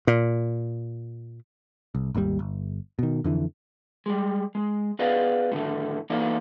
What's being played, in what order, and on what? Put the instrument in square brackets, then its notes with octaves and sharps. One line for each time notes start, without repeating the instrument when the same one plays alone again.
[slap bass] A#2
[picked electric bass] C2
G#1 D#2 C#3 G3
G1
B2 D#3
F2 D3 E3
[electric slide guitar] G3 G#3
G#3
B3 G#4 B4 D5 D#5 F5
A2 D3 D#3 A3
E3 A#3 D#4 A4 D5